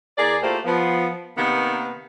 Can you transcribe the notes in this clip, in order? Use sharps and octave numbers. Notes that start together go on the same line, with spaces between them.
E2 G#4 A#4 D5
A3 A#3 E4 F4 G4 C5
F3 B3
C3 D#3 A#3 B3